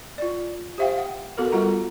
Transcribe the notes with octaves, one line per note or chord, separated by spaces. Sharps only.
F4 D5
G4 C5 E5 F5 G5
F#5
B3 F#4 A4 A#4
G3 F4 F#5 A#5